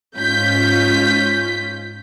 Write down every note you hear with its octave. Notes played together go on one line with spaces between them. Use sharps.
G#2 C#4 F4 G6 B6